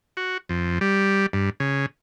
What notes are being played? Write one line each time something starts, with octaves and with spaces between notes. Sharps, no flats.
F#4
F2
G3
G2
C#3